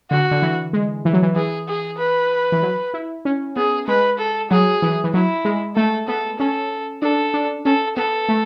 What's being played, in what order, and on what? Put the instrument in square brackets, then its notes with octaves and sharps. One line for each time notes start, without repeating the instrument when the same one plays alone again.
[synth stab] D3 [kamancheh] F#4
[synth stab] D3
E3
G#3
E3
F#3
E3
[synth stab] E3 [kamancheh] G#4
[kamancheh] G#4
B4
[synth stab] E3
F#3
E4
C#4
[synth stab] B3 [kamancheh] G#4
[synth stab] G#3 [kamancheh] B4
[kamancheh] A4
[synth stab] F#3 [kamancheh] G#4
[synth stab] E3
E3
[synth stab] F#3 [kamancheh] E4
[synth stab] G#3
[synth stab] A3 [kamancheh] A4
[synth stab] B3 [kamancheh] A4
[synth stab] C#4 [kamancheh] A4
[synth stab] D4 [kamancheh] A4
[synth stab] D4
[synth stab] C#4 [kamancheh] A4
[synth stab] B3 [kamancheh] A4
[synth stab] A3